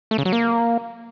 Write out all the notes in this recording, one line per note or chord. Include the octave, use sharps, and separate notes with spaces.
A3
C#3
F#3
A#3